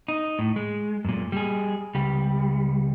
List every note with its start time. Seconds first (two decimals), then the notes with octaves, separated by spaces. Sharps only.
0.08 D#4
0.39 A2
0.56 G#3
1.05 F#2 A#2
1.32 G3 G#4
1.95 C#2 G3